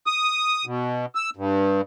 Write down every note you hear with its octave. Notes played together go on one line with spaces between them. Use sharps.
D#6
B2
E6
G2